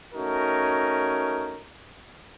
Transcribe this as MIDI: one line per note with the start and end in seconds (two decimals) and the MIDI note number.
0.14 1.62 57
0.14 1.62 61
0.14 1.62 63
0.14 1.62 66
0.14 1.62 70